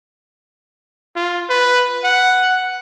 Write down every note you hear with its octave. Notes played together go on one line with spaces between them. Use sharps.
F4
B4
F#5